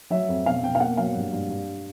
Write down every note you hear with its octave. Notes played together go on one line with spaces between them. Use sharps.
F#3 E5
F2
B2 F5
B2 G5
F5
A#3 F#5
F#3 F5
G2
G2
G2